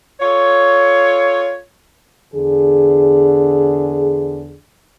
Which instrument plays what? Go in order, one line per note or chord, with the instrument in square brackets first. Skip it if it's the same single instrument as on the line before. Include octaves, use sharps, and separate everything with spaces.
[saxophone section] F4 A4 C#5
[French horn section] E2 D3 G#4